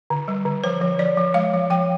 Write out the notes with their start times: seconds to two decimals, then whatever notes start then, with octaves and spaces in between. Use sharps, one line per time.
0.10 D3
0.28 G3
0.45 D3
0.64 F3 C5
0.81 F3
0.99 F3 D5
1.17 F3
1.34 G#3 F5
1.53 F3
1.70 F3 G5